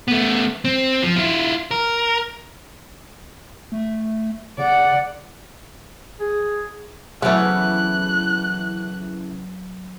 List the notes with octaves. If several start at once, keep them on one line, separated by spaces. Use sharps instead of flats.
A3 B3
C4
F3
E4 F4
A#4
A3
C#3 D5 F#5
G#4
C#3 E3 F#3 A3 B3 F#6